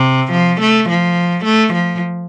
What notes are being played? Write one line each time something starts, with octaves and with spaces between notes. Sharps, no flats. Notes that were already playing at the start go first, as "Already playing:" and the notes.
Already playing: C3
F3
A3
F3
A3
F3